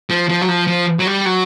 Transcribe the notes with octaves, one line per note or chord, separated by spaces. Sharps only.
F3
F3
F#3
F3
F3
F#3
G3
F#3